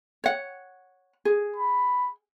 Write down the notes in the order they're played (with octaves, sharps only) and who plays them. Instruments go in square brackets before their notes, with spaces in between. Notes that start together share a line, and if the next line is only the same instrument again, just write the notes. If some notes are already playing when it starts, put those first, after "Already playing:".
[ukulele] C#5 F#5
G#4
[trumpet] B5